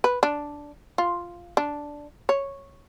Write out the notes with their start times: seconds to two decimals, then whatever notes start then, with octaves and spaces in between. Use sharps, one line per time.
0.04 B4
0.23 D4
0.98 F4
1.57 D4
2.29 C#5